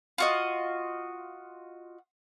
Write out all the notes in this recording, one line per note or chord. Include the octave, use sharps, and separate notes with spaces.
F4 F#4 D#5